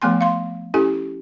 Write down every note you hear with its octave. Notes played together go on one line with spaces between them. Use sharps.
F3 A3 B3 G#5 C6
F5 C6
C#4 E4 G4 A4 G#5